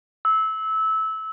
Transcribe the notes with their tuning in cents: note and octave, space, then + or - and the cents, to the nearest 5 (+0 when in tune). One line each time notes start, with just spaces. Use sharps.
E6 -20